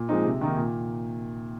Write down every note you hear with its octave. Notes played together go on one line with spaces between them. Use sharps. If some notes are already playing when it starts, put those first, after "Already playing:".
Already playing: A#2
F3 G#3 C4 D#4
C3
D#3 A#3 D#4
A#2